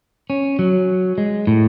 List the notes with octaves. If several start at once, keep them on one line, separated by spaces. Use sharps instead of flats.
C#4
F#3
G#3
A2